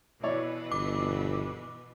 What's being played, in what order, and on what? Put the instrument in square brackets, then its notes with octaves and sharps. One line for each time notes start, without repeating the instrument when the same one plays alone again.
[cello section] B2 E3 B4 [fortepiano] E4 C#5 D5
[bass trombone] G1 [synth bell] D6